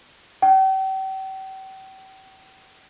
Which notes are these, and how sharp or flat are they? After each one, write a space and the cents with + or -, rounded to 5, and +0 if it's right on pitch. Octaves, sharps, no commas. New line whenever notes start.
G5 -40